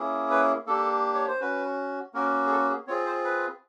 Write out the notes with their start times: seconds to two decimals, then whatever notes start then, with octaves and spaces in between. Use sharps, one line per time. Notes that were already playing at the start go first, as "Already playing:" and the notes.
Already playing: A#3 C#4 E4 G#4
0.30 B4
0.66 A#3 D4 G4 A4
1.14 C#5
1.28 C5
1.40 C#4 F#4 B4
2.14 A#3 C#4 F#4 A#4
2.46 G#4
2.51 A4
2.69 G#4
2.87 C4 F4 G#4 C#5
3.06 C5
3.24 B4